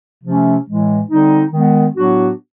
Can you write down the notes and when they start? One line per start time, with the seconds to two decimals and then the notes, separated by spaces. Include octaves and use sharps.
0.23 C3 F3 A3 C#4
0.66 A2 E3 G#3
1.09 D3 G3 C4 D#4
1.52 D#3 G#3 B3
1.96 A2 F#3 B3 D4 F#4